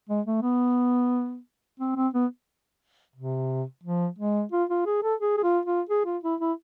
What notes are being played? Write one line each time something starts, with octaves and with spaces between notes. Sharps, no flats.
G#3
A3
B3
C4
C4
B3
C3
F3
G#3
F4
F4
G#4
A4
G#4
G#4
F4
F4
G#4
F4
E4
E4